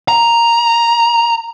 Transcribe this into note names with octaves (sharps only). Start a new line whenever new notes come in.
A#5